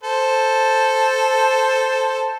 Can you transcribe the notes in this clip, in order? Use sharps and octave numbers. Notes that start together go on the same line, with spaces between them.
A4 C5